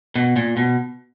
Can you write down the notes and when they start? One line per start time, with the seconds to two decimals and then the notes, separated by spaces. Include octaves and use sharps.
0.15 B2
0.36 A#2
0.57 B2